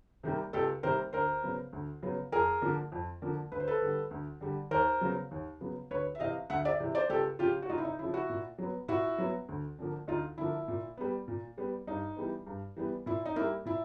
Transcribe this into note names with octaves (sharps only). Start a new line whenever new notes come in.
C3 D#3 G3 A#3
C#2 G4 A4
C3 D#3 G3 A#3 A#4 C5
D2 A#4 C5
C#3 F#3 B3
D2
C#3 F#3 B3
F2 G#4 A#4
D3 F3 A#3
F2
D3 F3 A#3
D2 B4
C5
A4 B4
D3 G3
D2
D3 G3
D#2 A#4 C5
C#3 F#3 B3
D#2
C#3 F#3 B3
D2 B4 C#5
E5
C3 E3 D#5 F5
D2 E5 F#5
D5 E5
C3 E3
C5 D5
C#2 G4 A4
C#3 F3 F4 G4
F#4
C#2 D#4 F4
E4
D#4
C#3 F3 E4
E4 F#4
A#2
F#3 B3
A#2 E4 F#4
F#3 B3
D2
D3 F3 A#3
D2 D#4 F4
D3 F3 A#3 E4
A#2
G3 B3
A#2
G3 B3
G2 D#4
E3 G3 B3
G2
E3 G3 B3
A#2 E4
D#4
G3 A#3 E4
A#2 E4